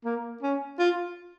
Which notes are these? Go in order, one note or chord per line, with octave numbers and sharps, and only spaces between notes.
A#3
C#4
F4